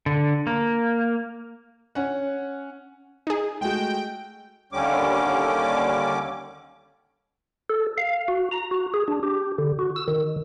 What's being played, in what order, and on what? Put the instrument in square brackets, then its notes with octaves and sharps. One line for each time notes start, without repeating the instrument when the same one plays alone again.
[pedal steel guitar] D3
A#3
[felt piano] C#4 F#5
[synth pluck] D#4 G#4
[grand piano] G#3 A3 F#4 [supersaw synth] G5
[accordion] D#2 D3 G3 C#4 D6
[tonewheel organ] A4
F5
F#4
A#5
F#4
G#4
D4
G4
D3
F#4
E6
D#3